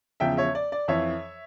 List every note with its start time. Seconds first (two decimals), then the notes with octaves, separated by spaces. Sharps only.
0.20 E2 C#3 F3 E5 G5
0.37 C#5 E5
0.55 D5
0.72 D5
0.88 F2 E3 C#5 E5